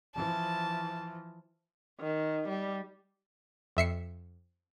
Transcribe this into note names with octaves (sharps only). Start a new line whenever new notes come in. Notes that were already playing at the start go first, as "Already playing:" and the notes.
E3 F3 A5
D#3
G3
F2 E5 C7 C#7